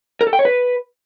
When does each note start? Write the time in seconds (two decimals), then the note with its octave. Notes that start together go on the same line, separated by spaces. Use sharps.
0.21 A#4
0.27 A4
0.33 G5
0.39 C#5
0.45 B4